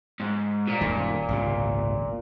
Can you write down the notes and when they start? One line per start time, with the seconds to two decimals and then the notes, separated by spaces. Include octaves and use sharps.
0.20 G#2
0.67 A#2
0.81 D#1 F#2 D#3
1.28 G#1 C#2 C3